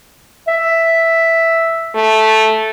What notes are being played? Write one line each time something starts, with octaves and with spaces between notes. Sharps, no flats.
E5
A3